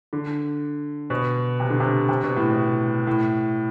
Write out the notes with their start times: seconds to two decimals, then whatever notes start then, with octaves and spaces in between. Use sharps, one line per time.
0.13 D3
1.10 B2
1.60 C3
1.70 D3
1.80 C3
2.09 C3
2.23 B2
2.37 A2
2.51 B2
3.07 A2